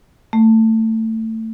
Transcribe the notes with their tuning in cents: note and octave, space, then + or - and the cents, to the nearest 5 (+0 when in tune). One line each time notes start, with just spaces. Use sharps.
A3 +20